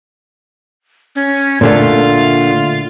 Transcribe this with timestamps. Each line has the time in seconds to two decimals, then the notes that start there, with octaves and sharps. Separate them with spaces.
1.16 C#4
1.61 A#2 D3 A3 F4